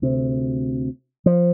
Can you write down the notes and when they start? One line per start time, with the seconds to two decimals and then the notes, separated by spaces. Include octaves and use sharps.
0.02 D2 C3
1.26 F3